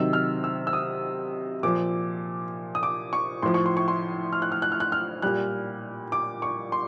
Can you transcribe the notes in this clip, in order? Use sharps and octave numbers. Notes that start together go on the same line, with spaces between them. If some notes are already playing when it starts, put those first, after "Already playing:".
Already playing: C3 D#3 F#3 E6
F6
E6
E6
D#6
A#2 F3 D6
D#6
D6
C#6
A2 F3 C6
C#6
C6
C#6
C6
F6
F#6
F6
F#6
F6
F#6
F6
A#2 G3 F#6
D6
C#6
C6